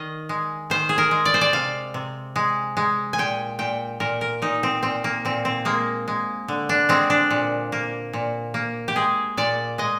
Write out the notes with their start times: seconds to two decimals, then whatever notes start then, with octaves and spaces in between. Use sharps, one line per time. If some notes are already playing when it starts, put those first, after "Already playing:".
Already playing: D#3 D#5 F5
0.29 G#3
0.70 D#3 C5
0.89 G#4
0.98 A#4
1.11 G#3
1.25 D5
1.34 C5
1.41 D5
1.53 C3 F5
1.94 C3
2.36 G#3
2.77 G#3
3.13 G#5
3.18 A#2 G5
3.59 A#2 G5
4.00 A#2 A#4
4.21 A#4
4.42 A#2 D#4
4.63 C4
4.83 A#2 C4
5.04 A#3
5.25 A#2 C4
5.45 C4
5.65 G#3 A#3
6.08 G#3
6.48 D3
6.69 D4
6.89 G#3 C4
7.10 D4
7.31 A#2
7.72 A#3
8.13 A#2
8.54 A#3
8.88 G4
8.96 G#3 G#4
9.37 A#2 D5
9.78 G#3 D#5